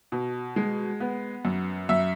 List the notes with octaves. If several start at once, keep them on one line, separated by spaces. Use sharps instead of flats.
B2
G#3
B3
F#2
F#2 E5